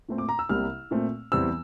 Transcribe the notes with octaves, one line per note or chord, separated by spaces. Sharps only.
A#2 A3 C4
D6
A#5
E6
C2 C3 G3 A#3 F6
A#2 A3 C4
E2 E3 G3 C4 E6